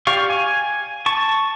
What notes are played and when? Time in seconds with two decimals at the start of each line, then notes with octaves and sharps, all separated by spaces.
0.07 G4 D5 F5 C#6
0.30 G#5
1.06 A5 C#6